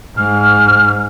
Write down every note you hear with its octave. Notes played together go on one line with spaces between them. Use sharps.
G#2 F6